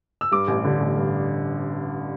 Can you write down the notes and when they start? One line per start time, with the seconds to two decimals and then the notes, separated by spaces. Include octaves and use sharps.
0.21 E6
0.32 G2 D6
0.48 A1
0.64 D3
0.80 A1
0.97 G2